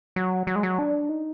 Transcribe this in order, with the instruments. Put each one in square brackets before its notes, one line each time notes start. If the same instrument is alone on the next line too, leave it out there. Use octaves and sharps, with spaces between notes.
[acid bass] F#3
F#3
G#3
F#3
D4
D#4